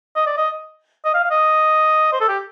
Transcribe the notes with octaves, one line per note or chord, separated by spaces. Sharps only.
D#5
D5
D#5
D#5
F5
F5
D#5
C5
A4
G4